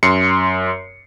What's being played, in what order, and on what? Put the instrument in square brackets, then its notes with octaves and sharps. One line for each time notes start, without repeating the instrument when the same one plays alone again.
[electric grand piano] F#2 C6 C7 C#7